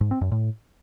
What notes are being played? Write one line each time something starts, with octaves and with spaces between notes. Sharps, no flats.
G#2
C4
F#2
A2